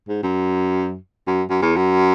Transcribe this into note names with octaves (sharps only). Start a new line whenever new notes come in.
G#2
F#2
F#2
F#2
E2
F#2